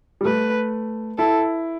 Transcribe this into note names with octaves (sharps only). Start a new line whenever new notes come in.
G3
A3 B4
E4 A4